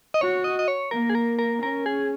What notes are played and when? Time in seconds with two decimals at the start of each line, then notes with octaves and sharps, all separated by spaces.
0.14 D#5
0.21 F#4 C#5
0.44 D#5
0.59 D#5
0.68 C#5
0.91 A#3 A#4
1.10 G#4
1.15 A#4
1.39 A#4
1.62 C#4 A#4
1.86 G#4